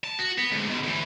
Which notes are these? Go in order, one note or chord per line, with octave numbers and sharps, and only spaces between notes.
A5
F#4
B3
D2 G#2
B2 D3
D2 E3